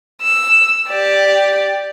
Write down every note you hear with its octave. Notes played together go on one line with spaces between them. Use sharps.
E6
G4 D5